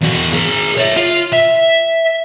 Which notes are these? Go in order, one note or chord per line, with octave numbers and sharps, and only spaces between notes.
E2 F#4
G#4 A#4
C#5 E5
F4
E5